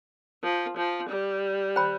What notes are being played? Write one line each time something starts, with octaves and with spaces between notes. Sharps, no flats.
F3
F3
G3
C5 G5 B5